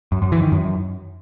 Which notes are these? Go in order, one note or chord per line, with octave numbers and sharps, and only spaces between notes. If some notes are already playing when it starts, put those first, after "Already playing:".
F#2
F#2
E3
D#3
F#2